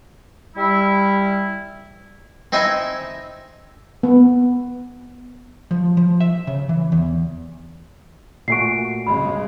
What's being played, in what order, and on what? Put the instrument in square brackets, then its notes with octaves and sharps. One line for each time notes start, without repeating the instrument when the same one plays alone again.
[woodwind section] G3 E4
[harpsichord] C4 D#4 E4 D#5 E5 G#5
[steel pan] B3
[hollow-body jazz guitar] F3
F3
E5
C#3
E3
E2
[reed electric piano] A#2 A3 F#4 [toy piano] F5 G#5 C#6 [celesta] C7 D7
[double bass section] G2 C#3 G#3 [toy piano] B5